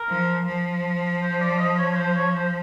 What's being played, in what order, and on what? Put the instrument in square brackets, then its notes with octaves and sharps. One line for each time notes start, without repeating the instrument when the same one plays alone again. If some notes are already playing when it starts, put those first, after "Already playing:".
Already playing: [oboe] A#4
[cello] F3
F3
[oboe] C5
D5
D#5
C#5
C#5
C5
C#5
C5